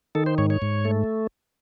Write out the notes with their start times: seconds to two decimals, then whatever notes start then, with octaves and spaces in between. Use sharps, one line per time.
0.15 D#3 A4
0.26 C5
0.38 G#2 C#5
0.50 C#5
0.62 G#2
0.85 A3